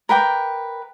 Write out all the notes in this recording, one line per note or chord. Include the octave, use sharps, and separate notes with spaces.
A#4 B4 G5 D6